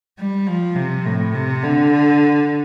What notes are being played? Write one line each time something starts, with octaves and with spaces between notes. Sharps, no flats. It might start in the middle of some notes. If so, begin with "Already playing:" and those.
G3
F3
C3
A2
C3
D3